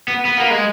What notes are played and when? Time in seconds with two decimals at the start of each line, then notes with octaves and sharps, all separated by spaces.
0.08 B3
0.25 B3
0.38 A#3
0.51 G#3